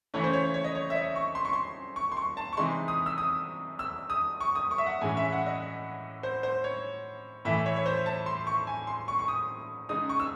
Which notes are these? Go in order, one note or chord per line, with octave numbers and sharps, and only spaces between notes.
C#3 E3 A3 C#4 C#5
C5
C#5
C#5
D#5
C#5
E5
D#5
C#6
C6
C#6
C6
C#6
C6
C#6
A5
C#6
C3 E3 G#3 D#4 C6
D#6
E6
D#6
E6
D#6
C#6
D#6
C#6
E5
F#5
A2 E3 G#3 C#4 G#5
E5
F#5
D#5
C5
C5
C#5
A2 E3 A3 E5
C#5
C#5
C5
A5
C6
C#6
G#5
C6
C#6
C#6
D#6
C#3 G#3 D#4 D#6
C#6
E6